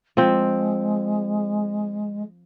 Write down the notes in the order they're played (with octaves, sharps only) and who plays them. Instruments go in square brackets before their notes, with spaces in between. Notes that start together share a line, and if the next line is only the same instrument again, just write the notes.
[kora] F3 C4 [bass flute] G#3